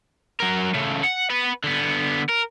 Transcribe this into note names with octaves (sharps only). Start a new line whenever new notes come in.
F#3 A#4
C#3 A3
F#5
B3 B4
D3 B3
A#4